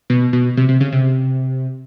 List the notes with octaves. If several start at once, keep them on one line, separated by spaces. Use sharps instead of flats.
B2
B2
C3
C3
C#3
C3